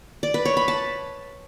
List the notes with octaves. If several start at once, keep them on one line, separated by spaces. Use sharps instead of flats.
D5
B4
C#5
B5
A5